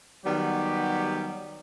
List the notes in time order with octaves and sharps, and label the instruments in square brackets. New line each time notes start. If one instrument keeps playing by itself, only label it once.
[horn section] D#3 F#3 G3 B3 G4